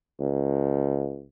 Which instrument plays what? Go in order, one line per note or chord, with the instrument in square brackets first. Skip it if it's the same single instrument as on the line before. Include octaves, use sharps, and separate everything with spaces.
[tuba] C#2